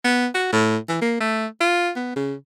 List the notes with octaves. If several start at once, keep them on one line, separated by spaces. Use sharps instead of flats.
B3
F#4
A2
E3
A#3
A3
F4
B3
C#3